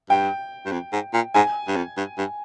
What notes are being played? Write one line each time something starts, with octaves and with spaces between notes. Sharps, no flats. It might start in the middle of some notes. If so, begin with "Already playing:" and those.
G2 G5
G2
F2
G#2
A#2
G#2 G#5
G2
F2
G2
G2